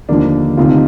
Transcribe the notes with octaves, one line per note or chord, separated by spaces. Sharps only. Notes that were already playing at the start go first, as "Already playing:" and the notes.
D#2 D3 F3 A#3 D4
D2 C3 D#3 F4
D#4